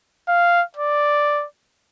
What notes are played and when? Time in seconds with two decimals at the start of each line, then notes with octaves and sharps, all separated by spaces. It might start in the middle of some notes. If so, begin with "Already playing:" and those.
0.28 F5
0.77 D5